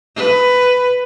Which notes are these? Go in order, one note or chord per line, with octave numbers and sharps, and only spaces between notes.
B4